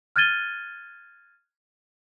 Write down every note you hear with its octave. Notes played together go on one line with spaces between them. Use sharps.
F6 F#6 G#6 A6 D#7 G7